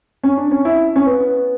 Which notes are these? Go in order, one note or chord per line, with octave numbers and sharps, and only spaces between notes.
C#4
D4
C#4
E4
C#4
B3